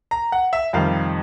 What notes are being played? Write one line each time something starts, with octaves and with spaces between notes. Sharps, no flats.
A#5
F#5
E5
F2 C3 D#3 G3 F5